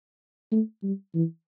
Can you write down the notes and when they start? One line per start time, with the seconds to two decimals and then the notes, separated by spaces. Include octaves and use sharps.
0.52 A3
0.83 G3
1.14 E3